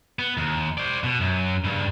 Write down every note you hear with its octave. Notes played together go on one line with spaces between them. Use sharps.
B3
D#2
C5 D5
B2
F#2
G2 C#3